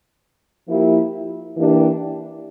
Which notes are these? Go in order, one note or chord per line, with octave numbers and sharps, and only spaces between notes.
F3 A#3 E4 G4
E3 A#3 D4 G4